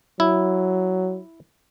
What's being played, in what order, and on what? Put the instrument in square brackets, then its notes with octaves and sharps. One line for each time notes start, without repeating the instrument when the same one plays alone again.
[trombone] F#3 [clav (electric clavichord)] E4